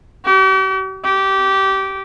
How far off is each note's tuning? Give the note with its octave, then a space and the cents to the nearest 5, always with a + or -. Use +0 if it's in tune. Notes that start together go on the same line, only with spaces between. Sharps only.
G4 -45
G4 -20